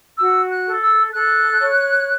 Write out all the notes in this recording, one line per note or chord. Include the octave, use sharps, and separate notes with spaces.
F#4 E6
F#6
A4
E6
A4 F#6
C#5